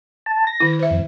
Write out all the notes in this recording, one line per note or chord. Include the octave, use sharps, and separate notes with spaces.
A5
A#6
D#3 E4
C5 E5
F2